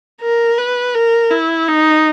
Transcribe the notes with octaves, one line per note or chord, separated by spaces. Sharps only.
A#4
B4
A#4
E4
D#4